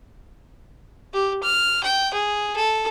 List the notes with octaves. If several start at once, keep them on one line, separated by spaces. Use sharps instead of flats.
G4
F6
G5
G#4
A4